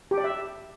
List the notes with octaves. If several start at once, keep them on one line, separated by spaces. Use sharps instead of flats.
G4
D5
E5